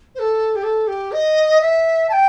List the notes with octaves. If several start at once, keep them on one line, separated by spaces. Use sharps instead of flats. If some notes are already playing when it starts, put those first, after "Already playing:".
C5
A4
G4
A4
G4
D#5
E5
A5
G5